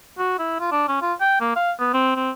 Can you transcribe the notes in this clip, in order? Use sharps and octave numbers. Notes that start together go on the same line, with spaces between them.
F#4
E4
F4
D4
C#4
F4
G5
A#3
F5
B3
C4
C4